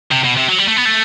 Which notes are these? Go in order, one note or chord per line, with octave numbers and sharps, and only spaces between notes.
C3
B2
C3
F#3
G3
A3
B3
A3